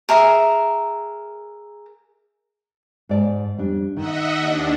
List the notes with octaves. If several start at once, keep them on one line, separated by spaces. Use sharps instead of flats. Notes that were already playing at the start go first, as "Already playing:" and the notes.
G#4 A#4 E5 A#5
G#2 D5 A5
F2 G3 D4
D#3 D#5 E5 F#5
D#2 D4